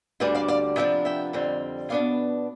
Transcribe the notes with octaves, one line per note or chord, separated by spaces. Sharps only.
D2 D3 G3 D4 B4 D5
D5 F5
D5 F5
C3 F3 B3 D4 E5 G5
E5 G5
F2 D3 G3 C4
B2 B3 D4 D5 F5